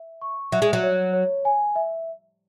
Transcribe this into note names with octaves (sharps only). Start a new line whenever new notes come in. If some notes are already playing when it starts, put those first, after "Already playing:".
Already playing: E5
C#6
F#3 E5
G#3
F#3
C#5
C#5
G#5
E5